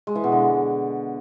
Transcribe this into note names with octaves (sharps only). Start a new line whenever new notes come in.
G#3
E3
B2
D3